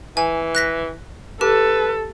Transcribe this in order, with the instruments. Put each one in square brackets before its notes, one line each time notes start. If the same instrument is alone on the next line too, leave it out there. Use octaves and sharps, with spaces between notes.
[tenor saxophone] E3 [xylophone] G#5
[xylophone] F#6 A#6 B6
[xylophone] G4 [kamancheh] A4 [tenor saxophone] B4